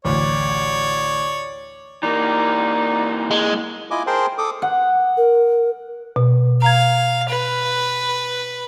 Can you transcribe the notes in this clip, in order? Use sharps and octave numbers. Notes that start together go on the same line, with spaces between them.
A1 D2 C#5 D5
E3 A#3 D#4 D5
G#3
E4 F4 D#5 G#5 D6
G#4 A#4 C5 G5 A5 C6
A4 D6 D#6
F#5
A#4
B2
F5 A#5 G#6
B4